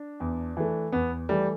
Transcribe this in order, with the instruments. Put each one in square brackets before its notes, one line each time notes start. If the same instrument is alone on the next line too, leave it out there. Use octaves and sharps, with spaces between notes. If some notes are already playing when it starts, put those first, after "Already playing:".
Already playing: [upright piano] D4
[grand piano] E2
E3 A3
[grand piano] E2 [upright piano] B3
[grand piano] E3 A3 [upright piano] G3